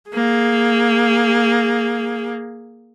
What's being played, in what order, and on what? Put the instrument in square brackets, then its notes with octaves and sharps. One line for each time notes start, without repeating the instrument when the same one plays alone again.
[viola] A#3 G#4